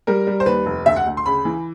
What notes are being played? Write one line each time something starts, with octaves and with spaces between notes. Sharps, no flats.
G3 A#4
G3
C5
D#2 B4
F1
D2 E5
F#5
D2
C6
C#3 B5
E3